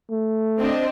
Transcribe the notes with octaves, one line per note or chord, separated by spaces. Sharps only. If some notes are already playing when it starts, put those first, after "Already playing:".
A3
C4 D4 D#5